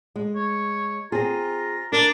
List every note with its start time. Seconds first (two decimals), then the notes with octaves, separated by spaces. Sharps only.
0.16 G#3
0.36 C#5
1.12 C4 F4 G#4 A#5
1.92 D4 A#4